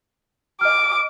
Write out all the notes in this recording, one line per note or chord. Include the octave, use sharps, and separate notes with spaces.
D#5 D6 F6